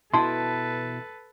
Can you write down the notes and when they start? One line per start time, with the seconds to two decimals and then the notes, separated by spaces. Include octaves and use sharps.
0.14 B2 E4 A4 B4 A5 C6